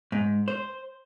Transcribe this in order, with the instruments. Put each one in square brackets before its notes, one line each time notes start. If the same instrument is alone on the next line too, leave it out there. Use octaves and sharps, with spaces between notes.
[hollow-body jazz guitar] G#2
C5